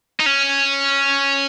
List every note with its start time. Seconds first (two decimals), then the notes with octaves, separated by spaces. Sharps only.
0.20 D#4
0.26 C#4